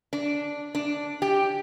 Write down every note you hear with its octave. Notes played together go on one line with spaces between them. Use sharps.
D4
D4
G4